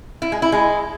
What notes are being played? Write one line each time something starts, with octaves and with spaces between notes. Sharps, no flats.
E4
G#3
E4
G#3